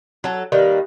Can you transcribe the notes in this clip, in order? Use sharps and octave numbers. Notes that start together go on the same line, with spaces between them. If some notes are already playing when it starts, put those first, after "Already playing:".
F#3 A4
D#3 G3 A#3 B4